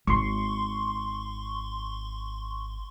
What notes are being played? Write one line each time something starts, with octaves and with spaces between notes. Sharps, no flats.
G#1 C6 C#6